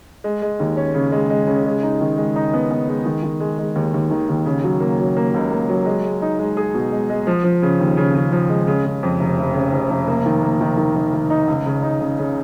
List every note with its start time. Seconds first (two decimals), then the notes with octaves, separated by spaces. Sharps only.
0.24 G#3
0.42 G#3
0.60 D#2
0.77 C#4
0.94 C#3
1.12 G#3
1.30 G#3
1.47 C#3
1.66 G#3
1.83 D#4
2.01 D#3
2.18 G#3
2.36 D#4
2.53 B3
2.70 B3
2.89 G#3
3.06 D#3
3.23 D#3
3.40 G#3
3.58 G#3
3.75 D#2
3.94 D#2
4.11 D#3
4.29 D#2
4.45 C#3
4.64 F#3
4.80 A#3
4.99 F#3
5.17 A#3
5.34 C#2
5.51 A#3
5.69 F#3
5.86 G#3
6.04 G#3
6.22 D#4
6.39 G#3
6.57 G#4
6.74 B2
6.92 G#3
7.10 G#3
7.27 F3
7.44 F3
7.62 C#3
7.80 D#2
7.97 C#3
8.15 C#3
8.32 F3
8.50 G#3
8.67 C#3
8.85 C#3
9.03 F2
9.20 F1
9.37 F1
9.54 C#3
9.72 F1
9.90 F1
10.08 A#3
10.26 D#3
10.43 A#3
10.61 D#3
10.77 D#3
10.95 D#3
11.13 D#3
11.30 D#4
11.48 C#2
11.66 C#3
11.83 D#4
12.00 C#3
12.18 C#3